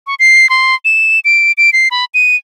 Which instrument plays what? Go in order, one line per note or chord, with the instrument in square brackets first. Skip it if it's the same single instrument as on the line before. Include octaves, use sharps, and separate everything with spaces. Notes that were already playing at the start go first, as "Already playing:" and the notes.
[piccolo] C#6
C7
C6
E7
D7
D7
C7
B5
D#7